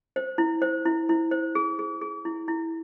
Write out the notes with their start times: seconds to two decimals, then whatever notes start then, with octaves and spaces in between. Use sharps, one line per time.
0.16 C5
0.38 E4
0.62 C5
0.85 E4
1.09 E4
1.31 C5
1.55 G#4
1.79 G#4
2.01 G#4
2.25 E4
2.48 E4